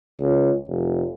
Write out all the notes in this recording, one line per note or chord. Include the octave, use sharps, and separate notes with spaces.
C#2
F1